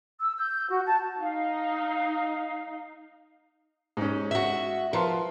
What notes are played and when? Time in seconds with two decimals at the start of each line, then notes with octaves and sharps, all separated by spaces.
0.20 E6
0.38 G6
0.69 F#4
0.87 A5
1.21 D#4 F5
3.97 G#2 C#4
4.31 F#4 E5
4.93 F3 A#4 B4 C6